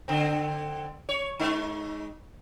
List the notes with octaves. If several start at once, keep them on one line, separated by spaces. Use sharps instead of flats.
D3 C4
C#5
G#3 D#4